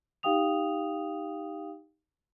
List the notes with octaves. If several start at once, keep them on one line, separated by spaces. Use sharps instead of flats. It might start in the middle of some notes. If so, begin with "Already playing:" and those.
D#4 G4 F5 G5 D#6 F7